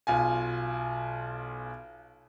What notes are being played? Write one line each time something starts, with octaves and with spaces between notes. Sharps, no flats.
B1 F4 G#5